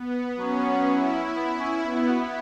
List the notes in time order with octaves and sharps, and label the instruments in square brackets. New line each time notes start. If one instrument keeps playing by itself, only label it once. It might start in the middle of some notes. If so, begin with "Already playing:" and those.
Already playing: [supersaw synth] B3
[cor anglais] F#3 [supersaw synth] C#4
[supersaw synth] E4
[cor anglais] B3
C#4
[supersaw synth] B3 [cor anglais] E4
[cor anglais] E4
F#4
E4